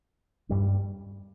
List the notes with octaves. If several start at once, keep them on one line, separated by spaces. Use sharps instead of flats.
G2 G3 C#4